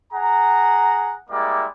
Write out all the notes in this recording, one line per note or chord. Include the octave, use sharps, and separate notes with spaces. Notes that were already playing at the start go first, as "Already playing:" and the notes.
G#4 F#5 A#5
G3 G#3 A#3 E4 D5